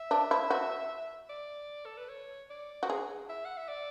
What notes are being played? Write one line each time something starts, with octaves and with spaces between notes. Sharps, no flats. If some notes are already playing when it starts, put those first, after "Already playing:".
Already playing: E5
D4
E4
F#4
D5
A4
B4
C#5
D5
F#4
G#4
E5
F#5
E5
D5